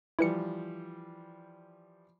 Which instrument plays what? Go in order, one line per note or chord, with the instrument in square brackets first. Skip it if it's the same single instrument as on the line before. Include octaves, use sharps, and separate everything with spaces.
[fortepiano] E3 F3 G3 [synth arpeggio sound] E4 B4 C#7